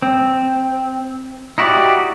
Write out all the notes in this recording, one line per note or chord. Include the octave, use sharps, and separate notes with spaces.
C4
D#4 E4 F#4 G4 D5